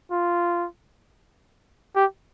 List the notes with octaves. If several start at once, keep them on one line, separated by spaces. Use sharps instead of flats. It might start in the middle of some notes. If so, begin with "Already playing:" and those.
F4
G4